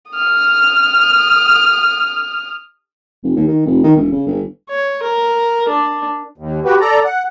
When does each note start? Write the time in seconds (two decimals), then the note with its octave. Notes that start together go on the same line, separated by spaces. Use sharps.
0.11 D#6 F6
3.23 F1
3.36 D#2
3.48 D#3
3.65 F1
3.83 D#3
3.96 E1
4.12 C#3
4.27 G1
4.70 C#5
5.03 A#4
5.69 D4
6.38 D#2
6.65 F#4 G4 B4
6.81 A4 D5 A#5
7.05 F#5